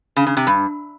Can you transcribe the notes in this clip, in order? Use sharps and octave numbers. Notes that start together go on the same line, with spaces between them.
C#3
C#3
C3
G2